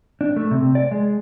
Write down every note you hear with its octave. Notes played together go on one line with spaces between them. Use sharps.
D4
A3
C3
D5
G#3